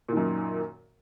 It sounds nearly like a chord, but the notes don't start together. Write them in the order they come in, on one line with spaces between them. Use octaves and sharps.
A#2 D#3 F#2